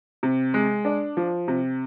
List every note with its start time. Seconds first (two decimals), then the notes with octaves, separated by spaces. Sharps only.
0.23 C3
0.54 G#3
0.85 D4
1.17 F3
1.48 C3